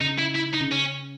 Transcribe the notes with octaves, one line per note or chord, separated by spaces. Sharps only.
C#3 D#4
E4
E4
D#4
C#3
C#4